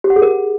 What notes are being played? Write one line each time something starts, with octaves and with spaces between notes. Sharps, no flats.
G4
F#5
G#4
A#4